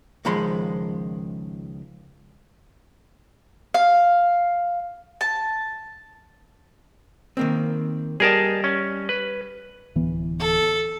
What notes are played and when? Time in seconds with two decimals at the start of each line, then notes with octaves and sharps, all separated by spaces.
0.25 C#2 D#3 F3 G#3 B5 C6
3.74 F5
5.21 A5
7.37 D#3 A#3 C4
8.20 G3 G4 G#4 A#4 D#5 A5
8.64 C#4
9.09 B4
9.96 D1 E3 B3
10.40 A4